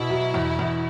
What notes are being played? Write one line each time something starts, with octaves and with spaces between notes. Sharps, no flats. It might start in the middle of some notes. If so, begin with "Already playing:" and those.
Already playing: B2 E4
F#3
E2
E2